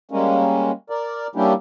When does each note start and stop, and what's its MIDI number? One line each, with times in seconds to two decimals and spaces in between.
0.11 0.71 55
0.11 0.71 56
0.11 0.71 58
0.11 0.71 61
0.90 1.27 70
0.90 1.27 74
1.36 1.53 55
1.36 1.53 58
1.36 1.53 61
1.36 1.53 62
1.36 1.53 64
1.36 1.53 67